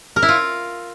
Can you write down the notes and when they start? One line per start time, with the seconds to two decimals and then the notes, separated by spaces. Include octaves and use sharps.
0.16 A#4
0.22 E4
0.29 F4